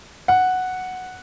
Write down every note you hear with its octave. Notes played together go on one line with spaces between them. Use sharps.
F#5